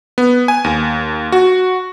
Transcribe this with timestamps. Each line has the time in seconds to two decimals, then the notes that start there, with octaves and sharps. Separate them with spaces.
0.18 B3
0.48 G#5
0.64 D#2
1.32 F#4